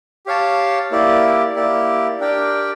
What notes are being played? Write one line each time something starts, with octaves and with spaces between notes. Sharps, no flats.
G4 C#5 F5 A5
A#3 E4 G4 D5
A#3 E4 G4 D5
D4 G4 A#4 D5 G5